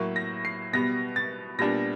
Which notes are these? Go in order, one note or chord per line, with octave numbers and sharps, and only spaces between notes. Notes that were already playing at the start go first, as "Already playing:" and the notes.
Already playing: A2 F#3 A#3
A#6
C7
B2 G3 B3 A#6
A6
A#2 G3 B3 D4 A#6